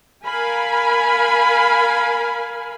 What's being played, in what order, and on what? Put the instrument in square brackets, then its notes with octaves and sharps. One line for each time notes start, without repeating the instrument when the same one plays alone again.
[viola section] A#4 F5 G#5 B5